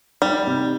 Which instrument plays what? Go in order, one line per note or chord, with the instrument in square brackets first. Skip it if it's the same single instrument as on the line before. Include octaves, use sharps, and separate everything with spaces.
[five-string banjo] G3 [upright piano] D#4
[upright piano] C3